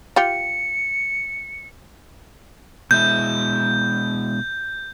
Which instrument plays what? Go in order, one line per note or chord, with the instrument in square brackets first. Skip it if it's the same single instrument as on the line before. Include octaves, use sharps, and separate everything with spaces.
[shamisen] F4 G4 [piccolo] C#7
[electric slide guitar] B2 G#3 E4 [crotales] G6